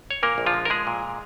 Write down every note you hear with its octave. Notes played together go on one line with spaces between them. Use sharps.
C#5
A#2 A#3 A#4
A#1
F3 F4
G#3
A#4
F3 G#3 G#4
A#2